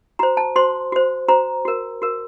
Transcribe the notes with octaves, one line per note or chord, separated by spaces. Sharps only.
F#4 C5 A#5
A5
F#4 C5 C6
F#4 C5
F#4 C5 A#5
F#4 A#4
F#4 A#4